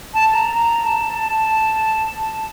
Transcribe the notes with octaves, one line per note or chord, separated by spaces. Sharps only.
A5
A#5
A#5
A5